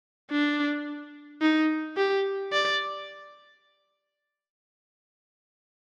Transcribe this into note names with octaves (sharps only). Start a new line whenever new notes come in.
D4
D#4
G4
D5